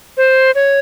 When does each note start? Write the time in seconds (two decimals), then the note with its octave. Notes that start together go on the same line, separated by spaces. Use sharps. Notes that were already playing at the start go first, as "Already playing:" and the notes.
0.17 C5
0.55 C#5